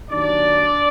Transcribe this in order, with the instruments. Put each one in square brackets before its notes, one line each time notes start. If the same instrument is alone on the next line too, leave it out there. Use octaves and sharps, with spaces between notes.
[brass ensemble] D#2 D#3 F#3 D4 D5